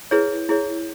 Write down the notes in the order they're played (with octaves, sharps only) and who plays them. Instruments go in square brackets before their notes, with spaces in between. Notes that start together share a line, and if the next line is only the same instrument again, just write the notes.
[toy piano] E4 G#4 B4 C#5
E4 G#4 C#5